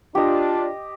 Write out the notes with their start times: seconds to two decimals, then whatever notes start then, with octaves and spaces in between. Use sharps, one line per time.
0.15 D4 F4 G4 D#5